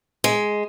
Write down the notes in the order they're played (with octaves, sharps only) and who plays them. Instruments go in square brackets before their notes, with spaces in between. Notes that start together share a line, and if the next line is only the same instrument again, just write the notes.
[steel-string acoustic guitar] G#3